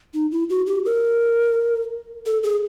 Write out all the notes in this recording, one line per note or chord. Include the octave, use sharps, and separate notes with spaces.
D#4
E4
F#4
G4
A#4
A4
G#4